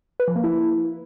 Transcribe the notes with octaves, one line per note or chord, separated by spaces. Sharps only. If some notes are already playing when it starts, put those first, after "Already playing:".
B4
F3
A#3
E4